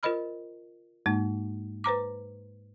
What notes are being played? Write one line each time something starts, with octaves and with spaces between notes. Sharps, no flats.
F4 A#4 C5 D#5 B5 F6
G#2 G#3 A#3 D#4
B4 C5 A#5 D6